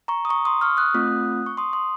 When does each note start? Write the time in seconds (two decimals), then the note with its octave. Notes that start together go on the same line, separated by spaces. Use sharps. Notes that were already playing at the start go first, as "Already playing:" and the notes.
0.08 A#5 C#6
0.25 D#6
0.29 A#5 C#6
0.45 C6 D#6
0.61 C#6 F6
0.77 D#6 F#6
0.94 A3 C4 F4
1.46 C#6
1.57 C6 D#6
1.73 C6 D#6